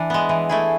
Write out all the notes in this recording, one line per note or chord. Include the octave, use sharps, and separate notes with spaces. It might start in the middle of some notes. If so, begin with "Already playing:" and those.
Already playing: E3 D4
G#3 B3
E3
A3 E4 G#4